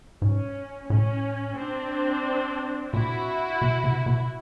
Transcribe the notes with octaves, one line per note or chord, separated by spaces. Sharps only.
G#2 C#4
A2 C#4
C4 D4
A#2 E4 F#4
B2
C3
B2